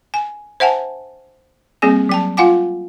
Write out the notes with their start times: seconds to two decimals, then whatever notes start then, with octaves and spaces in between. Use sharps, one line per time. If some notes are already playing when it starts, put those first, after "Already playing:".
0.14 G#5
0.60 C5 E5 F#5 G#5 A5
1.82 G3 A#3 C4 G#4 G#5
2.09 F#3 G5 A5
2.37 F4 F5 F#5 G#5 D6